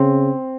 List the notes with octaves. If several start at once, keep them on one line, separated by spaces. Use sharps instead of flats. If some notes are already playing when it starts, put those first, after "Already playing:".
Already playing: C#3 C4